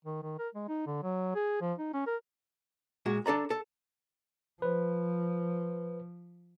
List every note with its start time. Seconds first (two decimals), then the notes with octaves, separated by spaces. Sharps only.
0.04 D#3
0.23 D#3
0.39 A#4
0.55 G#3
0.69 D#4
0.87 D3
1.03 F#3
1.35 G#4
1.61 F3
1.78 D#4
1.94 C#4
2.07 A#4
3.06 A#2 G#3 F#4
3.26 D4 A4 D5 A#5
3.50 A4
4.62 F3 B4 C5